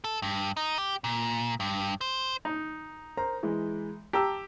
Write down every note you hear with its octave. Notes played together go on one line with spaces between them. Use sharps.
A4
G2
D#4
G4
A#2
G2
C5
D#4
A#4 C5 A#5
E3 G#3
G4 A5 A#5 E6